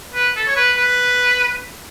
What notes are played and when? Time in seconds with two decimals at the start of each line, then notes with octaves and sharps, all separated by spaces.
0.14 B4
0.36 A4
0.47 C#5
0.56 B4
0.77 B4